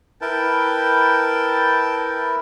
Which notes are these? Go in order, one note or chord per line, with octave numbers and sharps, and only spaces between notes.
E4 A#4 B4 G5 A5